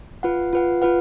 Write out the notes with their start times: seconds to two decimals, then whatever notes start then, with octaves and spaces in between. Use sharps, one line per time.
0.23 F4 B4 F#5
0.53 F4 B4 F#5
0.82 F4 B4 F#5